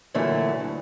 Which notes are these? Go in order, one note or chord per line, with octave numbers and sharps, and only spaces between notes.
A#2 D3 E3 F#3 A3 E4
D2